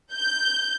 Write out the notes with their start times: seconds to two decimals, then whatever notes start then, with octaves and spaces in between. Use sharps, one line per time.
0.14 G6